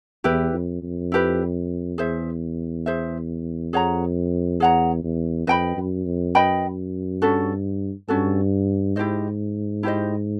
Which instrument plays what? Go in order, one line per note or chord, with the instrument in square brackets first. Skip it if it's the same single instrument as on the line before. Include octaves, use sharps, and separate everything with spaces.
[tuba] E2 [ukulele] E4 G4 B4
[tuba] F2
F2
[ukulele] E4 G4 B4
[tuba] E2 [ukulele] G#4 C5 E5
[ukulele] G#4 C5 E5
[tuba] F2 [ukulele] G#4 C#5 F#5 A#5
[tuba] E2 [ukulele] G#4 C#5 F#5 A#5
[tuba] E2
[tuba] F2 [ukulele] B4 D#5 G5 B5
[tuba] F#2
F2
[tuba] F#2 [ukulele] B4 D#5 G5 B5
[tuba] G2 [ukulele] C#4 F#4 A4
[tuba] G2 [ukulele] C#4 F#4 A4
[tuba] G#2 [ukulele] E4 G4 C5 D#5
[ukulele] E4 G4 C5 D#5